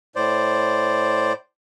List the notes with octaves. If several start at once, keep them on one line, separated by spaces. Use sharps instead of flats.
A2 C5 D5